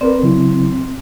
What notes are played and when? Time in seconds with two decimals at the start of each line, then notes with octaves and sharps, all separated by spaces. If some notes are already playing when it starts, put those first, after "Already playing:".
0.01 C4 A#4 B4 D5
0.23 C#3 F#3 E4